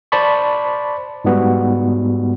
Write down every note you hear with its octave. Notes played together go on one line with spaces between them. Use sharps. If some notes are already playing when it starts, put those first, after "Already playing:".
C5 D5 A5 B5 C#6
G#2 G3 B3 F#4